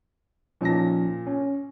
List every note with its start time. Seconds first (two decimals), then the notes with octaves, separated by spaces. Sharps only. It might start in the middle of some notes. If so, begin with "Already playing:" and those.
0.61 A#2 F3 C#4 D#4 A5 A#6
1.27 C#4